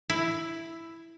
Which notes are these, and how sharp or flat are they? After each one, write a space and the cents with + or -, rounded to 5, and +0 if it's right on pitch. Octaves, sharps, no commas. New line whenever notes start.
E4 +5